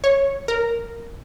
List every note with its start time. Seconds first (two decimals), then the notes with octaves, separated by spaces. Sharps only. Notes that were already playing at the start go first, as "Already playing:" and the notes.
0.04 C#5
0.48 A#4